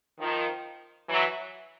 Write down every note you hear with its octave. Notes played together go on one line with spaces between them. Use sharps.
D#3 F3
E3 F#3